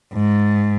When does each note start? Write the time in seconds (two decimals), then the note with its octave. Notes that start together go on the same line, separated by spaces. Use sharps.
0.13 G#2